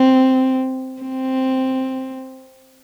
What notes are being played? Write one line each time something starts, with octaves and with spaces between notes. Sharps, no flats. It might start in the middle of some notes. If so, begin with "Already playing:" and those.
Already playing: C4
C4